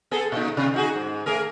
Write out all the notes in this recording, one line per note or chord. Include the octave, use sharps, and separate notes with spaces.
B3 G#4 A4
A#2 D#4
C3
D#4 F#4 G#4
G#2
A3 G#4 A#4